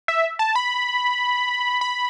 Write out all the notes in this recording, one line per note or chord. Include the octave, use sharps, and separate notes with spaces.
E5
A5
B5
B5